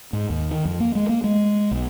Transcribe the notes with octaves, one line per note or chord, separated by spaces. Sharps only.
G#2
D#2
D#3
F2
A#3
G#3
A#3
G#3
B1